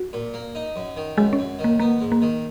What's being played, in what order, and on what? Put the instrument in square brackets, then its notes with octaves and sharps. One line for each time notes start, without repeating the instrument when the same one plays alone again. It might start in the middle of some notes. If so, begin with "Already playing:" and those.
Already playing: [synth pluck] F#4
[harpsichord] A#2
A#3
D#4
F#2
D#3
[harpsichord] F#2 [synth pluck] G#3
[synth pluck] C#4
[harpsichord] F#2
D#3
[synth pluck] A#3
[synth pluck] A#3 [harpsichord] B3
[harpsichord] G#2
[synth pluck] A#3
[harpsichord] D#3